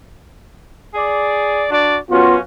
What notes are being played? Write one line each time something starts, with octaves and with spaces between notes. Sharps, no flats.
G#4 D5
D4 F#4 D5
F#2 B3 C#4 F4 F#4